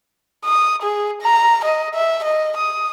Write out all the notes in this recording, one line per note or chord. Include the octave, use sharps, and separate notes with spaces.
D#6
G#4
A#5
D#5
E5
D#5
D#6